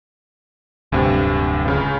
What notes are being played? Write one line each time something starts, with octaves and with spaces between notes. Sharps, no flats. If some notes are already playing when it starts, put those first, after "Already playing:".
D1 D2 G2 C3
C#2 C#3 F6